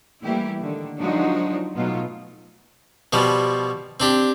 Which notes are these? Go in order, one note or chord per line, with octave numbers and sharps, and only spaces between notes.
E3 G3 A3 A#3 E4 G4
D3 D#3
F3 F#3 G#3 D4 D#4 F#4
B2 F#3 A3 B3 D#4 F4
B2 F3 G3
C4 D4 G4